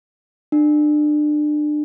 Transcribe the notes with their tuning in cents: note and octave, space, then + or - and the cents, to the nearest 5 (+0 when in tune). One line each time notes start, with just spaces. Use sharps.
D4 +30